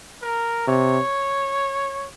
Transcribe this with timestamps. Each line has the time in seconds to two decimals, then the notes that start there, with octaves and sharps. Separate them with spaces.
0.22 A#4
0.67 C3 C#5